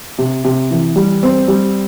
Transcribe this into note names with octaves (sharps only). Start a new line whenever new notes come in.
C3
C3
E3
G3
C4
G3